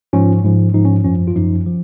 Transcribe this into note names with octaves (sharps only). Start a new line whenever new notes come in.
G#2 F3 C#4 F4
G#2 F3
G#2 F3 D#4
C#4
F#2 F3 C#4
F4
F#2 F3 D#4
F3